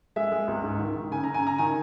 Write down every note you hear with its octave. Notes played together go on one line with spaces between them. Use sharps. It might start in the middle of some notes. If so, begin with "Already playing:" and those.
G#3 E5
G#3
C#2
G#2
D#3
D#3
C#3 G#5
C#3 A#5
G#5
C#3 A#5
D#3 G#5